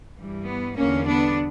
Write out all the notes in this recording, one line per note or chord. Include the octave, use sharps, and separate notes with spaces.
G2 E3 G3
B3
E2 D3 G3 A#3 C#4
B3 D4